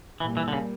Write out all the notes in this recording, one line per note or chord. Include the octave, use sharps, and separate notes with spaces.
A#2 E3 G3 A#3
E3
D3
C#3